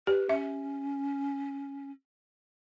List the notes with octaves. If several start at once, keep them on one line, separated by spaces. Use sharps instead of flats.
G4 B4
C#4 E5